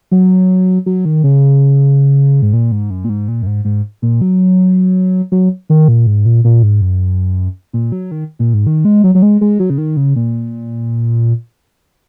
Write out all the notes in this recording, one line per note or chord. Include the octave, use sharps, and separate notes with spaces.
F#3
F#3
D#3
C#3
G#2
A#2
G#2
F#2
A#2
G#2
A#2
F#2
G#2
G#2
A#2
F#3
F#3
D#3
A#2
G#2
A#2
A#2
G#2
F#2
A#2
F#3
D#3
A#2
G#2
D#3
G#3
F#3
F#3
G#3
G#3
F#3
C#3
D#3
C#3
A#2